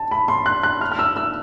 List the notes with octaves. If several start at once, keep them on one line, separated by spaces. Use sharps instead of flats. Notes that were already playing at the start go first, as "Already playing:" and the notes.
Already playing: A5
B5
C6
F#6
F#6
F6
F6
E6
E6